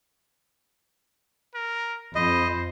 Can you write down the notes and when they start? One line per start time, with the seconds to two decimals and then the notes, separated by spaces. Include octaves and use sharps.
1.54 A#4
2.15 F2 C5 D#5 B5